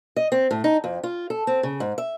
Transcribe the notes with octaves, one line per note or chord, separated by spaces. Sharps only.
D#5
C4
A2
D#4
F2
F4
A4
C4
C#3
G#2
E5